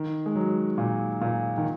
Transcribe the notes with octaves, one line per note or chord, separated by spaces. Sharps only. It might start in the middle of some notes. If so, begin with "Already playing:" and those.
Already playing: D#3
G#3
F#3
A#2
A#2
D#3